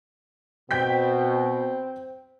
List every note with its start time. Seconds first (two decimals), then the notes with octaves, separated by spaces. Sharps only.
0.71 B2 C4 G5 G6 B6